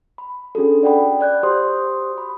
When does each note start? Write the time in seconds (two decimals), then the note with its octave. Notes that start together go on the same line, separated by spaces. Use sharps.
0.18 B5
0.55 C#4 D4 F#4 G#4 A4
0.83 D5 F#5 G5 B5
1.20 D5 F#6 G6
1.43 F#4 G4 C5 C6 D#6
2.18 B5